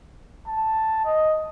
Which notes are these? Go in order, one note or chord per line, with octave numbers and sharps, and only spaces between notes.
A5
D#5